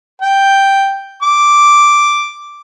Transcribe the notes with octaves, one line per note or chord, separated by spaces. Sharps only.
G5
D6